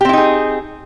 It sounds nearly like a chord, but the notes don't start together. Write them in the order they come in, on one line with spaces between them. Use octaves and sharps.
G4 C4 E4 D#4 G#4